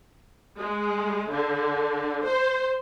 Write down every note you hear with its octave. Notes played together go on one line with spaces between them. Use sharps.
G#3
D3
C5